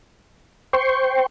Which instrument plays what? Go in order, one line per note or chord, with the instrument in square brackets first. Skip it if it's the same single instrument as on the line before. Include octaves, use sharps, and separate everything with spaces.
[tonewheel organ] C5 G5 C6 C#6